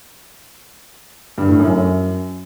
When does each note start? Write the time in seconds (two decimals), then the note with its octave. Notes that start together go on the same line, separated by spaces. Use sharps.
1.38 G2
1.49 A2
1.59 F#2
1.70 F#2